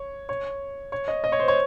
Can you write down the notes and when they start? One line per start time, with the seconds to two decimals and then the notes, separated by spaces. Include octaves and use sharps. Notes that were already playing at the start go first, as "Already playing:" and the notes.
Already playing: C#5
0.29 C#5
0.92 C#5
1.08 D#5
1.24 D#5
1.32 C#5
1.40 C5
1.48 C#5